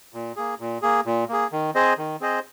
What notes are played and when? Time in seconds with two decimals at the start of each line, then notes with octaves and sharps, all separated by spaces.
0.14 A#2
0.36 A#3 G#4
0.60 A#2
0.82 A#3 G#4
1.06 A#2
1.29 A#3 G#4
1.52 D#3
1.75 C4 G#4 C5 D#5
1.98 D#3
2.21 C4 G#4 C5 D#5